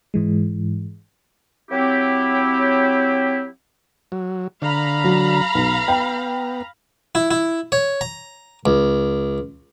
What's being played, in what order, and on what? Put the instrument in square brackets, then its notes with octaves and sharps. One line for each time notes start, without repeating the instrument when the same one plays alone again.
[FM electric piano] G#2 E3 G#3
[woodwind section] F#3 C4 E4 G4
[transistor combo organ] F#3
[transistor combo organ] D3 [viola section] F5 A#5 B5
[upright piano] F#3
B1
[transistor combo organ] B3 [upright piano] G5
[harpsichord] E4
E4
C#5
A#5
C#2